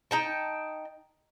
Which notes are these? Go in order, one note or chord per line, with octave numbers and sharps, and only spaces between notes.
D#4 G5 A5